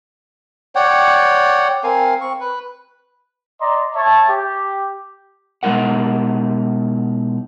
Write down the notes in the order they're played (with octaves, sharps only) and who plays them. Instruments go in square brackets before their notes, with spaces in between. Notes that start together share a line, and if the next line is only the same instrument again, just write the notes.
[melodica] C#5 D5 F#5 G5
C4 A#4 F5 G#5
C4 C#6
B4
[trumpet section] D5 D#5 A#5 C6
C#5 E5 A5
G4
[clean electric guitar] B2 G#3 D4 D#4 A#4 F#5